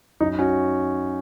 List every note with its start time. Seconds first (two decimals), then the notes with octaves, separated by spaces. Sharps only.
0.20 F#2 D#4
0.39 C#4 F#4